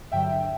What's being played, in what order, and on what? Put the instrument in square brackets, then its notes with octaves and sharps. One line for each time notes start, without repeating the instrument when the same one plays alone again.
[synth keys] G2 D3 F#3 E5 G5